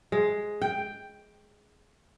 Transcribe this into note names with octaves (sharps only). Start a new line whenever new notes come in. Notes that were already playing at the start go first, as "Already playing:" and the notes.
G#3
G5